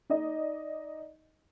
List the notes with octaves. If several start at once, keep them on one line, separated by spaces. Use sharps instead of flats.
D#4 D5 D#5